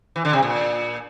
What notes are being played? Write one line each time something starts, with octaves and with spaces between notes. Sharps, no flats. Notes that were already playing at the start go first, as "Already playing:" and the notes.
E3
D3
C3
A#2